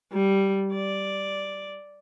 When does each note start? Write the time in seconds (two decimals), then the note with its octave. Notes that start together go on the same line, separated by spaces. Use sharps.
0.12 G3
0.74 D5